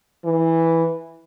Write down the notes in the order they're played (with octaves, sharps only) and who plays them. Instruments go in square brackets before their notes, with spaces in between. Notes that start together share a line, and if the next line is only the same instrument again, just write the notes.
[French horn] E3